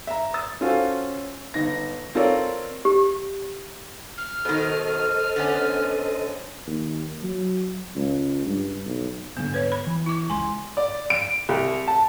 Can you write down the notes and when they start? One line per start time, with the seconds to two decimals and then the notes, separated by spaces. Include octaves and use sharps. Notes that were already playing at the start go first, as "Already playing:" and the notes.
0.07 E5 A#5
0.34 D#6 E6 A6
0.61 C#4 F4 F#4 A4 C5
1.54 G1 D#4 A#6
2.15 C4 F4 A4 A#4 C#5 D5
2.85 G4
4.18 F6
4.45 B2 D#3 A4 C5 D#5
5.36 D3 B3 C#4
6.67 D#2
7.23 F#3
7.95 C#2
8.46 G2
8.86 B1
9.37 D#1 G#1 D3 B3
9.54 B4 C#5
9.72 B5
9.87 E3
10.06 E4 D6
10.30 C#2 G#3 G#5 C6
10.77 D5
11.10 D7
11.49 C2
11.88 A5